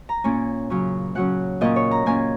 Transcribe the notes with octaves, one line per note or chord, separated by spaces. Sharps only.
A#5
A#2 A#3 C#4 G#5
C#3 F#3 C#4
C#3 F#3 C#4 F#5
A#2 A#3 C#4 D#5
C#5
A#5
A#2 A#3 C#4 G#5